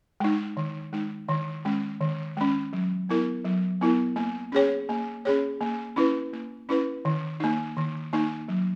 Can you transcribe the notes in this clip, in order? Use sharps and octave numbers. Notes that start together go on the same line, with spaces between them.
G#3 D#4
D#3
G#3 D#4
D#3
G#3 C#4
D#3
G#3 C#4
F#3
B3 E4 A#4
F#3
B3 E4 A#4
A#3
C#4 G#4 C#5
A#3
C#4 G#4 C#5
A#3
C#4 E4 B4
A#3
C#4 E4 B4
D#3
A#3 D#4
D#3
A#3 D#4
F#3